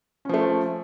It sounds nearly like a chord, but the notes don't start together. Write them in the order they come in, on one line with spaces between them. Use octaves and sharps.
C#4 F3 A3